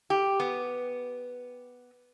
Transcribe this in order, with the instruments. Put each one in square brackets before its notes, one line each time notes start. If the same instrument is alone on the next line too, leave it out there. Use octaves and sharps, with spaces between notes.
[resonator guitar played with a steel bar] G4
B3